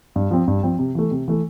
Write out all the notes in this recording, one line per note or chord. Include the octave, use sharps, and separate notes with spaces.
G2
F3 C4
G2
F3 C4
C3
E3 A3
C3
E3 A3